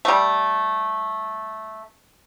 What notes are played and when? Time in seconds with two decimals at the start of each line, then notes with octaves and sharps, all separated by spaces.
0.05 G3 A3